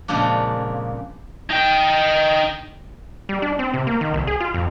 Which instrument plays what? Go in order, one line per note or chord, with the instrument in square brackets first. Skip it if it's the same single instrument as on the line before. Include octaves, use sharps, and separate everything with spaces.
[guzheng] F2 A#2 C#3 G#3 A#3 D4
[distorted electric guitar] D#4 G5
[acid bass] G3
D4
C4
C3
A#3
D#3
C2
G#4
F4
F2